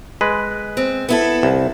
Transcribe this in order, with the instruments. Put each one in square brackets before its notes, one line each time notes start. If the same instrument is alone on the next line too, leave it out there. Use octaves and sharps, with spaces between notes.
[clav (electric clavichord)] G#3 B4
[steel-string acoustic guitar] C4
B3 E4 A4
[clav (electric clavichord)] C2